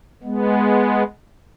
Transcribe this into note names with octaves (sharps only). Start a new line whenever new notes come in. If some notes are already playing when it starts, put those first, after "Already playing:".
G#3 B3